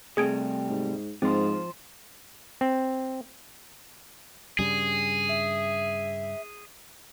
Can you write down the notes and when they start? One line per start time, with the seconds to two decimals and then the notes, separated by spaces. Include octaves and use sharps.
0.17 C3 G3 A3 G#4 G#6 D7
0.70 G#2
1.22 G#2 F3 C4 C5
2.61 C4
4.59 G2 C#3 G3 G#4
5.29 E5